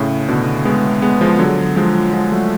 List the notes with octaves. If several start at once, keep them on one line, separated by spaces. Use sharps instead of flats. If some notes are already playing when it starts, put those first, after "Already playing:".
Already playing: A2 C#3
B2 D3
G#3 B3
G#3 B3
F3 G#3
D3 F#3
F3 G#3
F3 G#3
F#3 A3